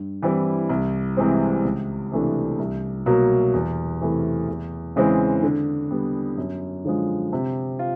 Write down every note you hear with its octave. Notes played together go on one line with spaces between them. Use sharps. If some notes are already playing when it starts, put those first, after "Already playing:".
Already playing: G2
E3 G3 C4 E4
C2
C3 E3 G#3 C4
C#2
C3 E3 A3 D4
C2
B2 F#3 A#3
E2
C3 E3 A3
E2
C#3 E3 G#3 C4
D3
G3 B3
F#2
D3 F3 G#3
C3
F4